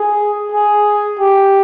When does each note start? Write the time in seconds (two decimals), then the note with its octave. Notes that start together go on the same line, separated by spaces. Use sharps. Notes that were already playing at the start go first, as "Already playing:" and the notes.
Already playing: G#4
0.52 G#4
1.20 G4